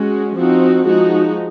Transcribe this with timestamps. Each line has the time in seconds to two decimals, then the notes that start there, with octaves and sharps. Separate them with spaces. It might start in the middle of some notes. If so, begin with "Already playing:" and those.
Already playing: G#3 C#4 F#4
0.36 F3 C4 D#4 F#4
0.85 F3 G#3 D#4 F#4